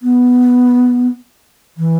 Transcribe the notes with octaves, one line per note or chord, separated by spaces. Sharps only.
B3
E3